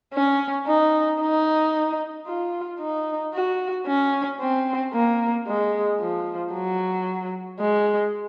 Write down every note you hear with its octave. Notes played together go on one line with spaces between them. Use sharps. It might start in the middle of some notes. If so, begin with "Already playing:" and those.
C#4
D#4
D#4
F4
D#4
F#4
C#4
C4
A#3
G#3
F3
F#3
G#3